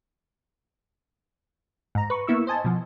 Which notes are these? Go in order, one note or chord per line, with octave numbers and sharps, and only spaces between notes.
G#2 A#5
B4 C#6
A#3 B3 E4 C#6 E6
C5 D#5 G#5 A5
B2 F3